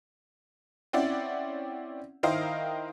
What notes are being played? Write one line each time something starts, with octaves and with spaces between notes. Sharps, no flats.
C4 C#4 E4 D5 F#5
D#3 E4 A#4 C5 D#5 F5